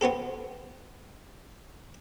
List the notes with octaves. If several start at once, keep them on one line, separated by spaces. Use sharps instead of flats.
B3 C4 G4 A4